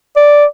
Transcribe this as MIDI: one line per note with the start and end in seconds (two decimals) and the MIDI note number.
0.16 0.45 74